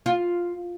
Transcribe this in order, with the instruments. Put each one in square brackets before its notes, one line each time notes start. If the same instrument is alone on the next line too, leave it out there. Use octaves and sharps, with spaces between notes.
[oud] F4